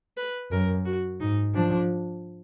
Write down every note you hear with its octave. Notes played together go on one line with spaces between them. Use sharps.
B4
F#2 A#4
F#4
G#2 D#4
F3 D4